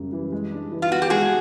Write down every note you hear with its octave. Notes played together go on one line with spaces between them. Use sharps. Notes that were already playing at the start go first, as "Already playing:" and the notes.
Already playing: F#2 C#3 G3
E3
G#3
D4
E3
F4
B3 F#4
G4
G#3 F#4 G#4